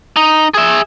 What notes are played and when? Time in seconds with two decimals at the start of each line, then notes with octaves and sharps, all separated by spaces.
0.16 D#4
0.54 G#4 E5